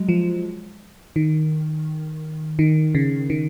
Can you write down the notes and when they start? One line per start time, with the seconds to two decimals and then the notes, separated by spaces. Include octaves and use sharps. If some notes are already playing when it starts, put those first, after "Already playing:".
Already playing: F#3 G#3
0.09 F3
1.16 D#3
2.59 D#3
2.95 C#3
3.30 D#3